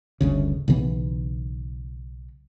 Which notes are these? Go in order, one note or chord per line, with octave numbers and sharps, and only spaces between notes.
G1 D2 C#3
B1 C#3 E3 B3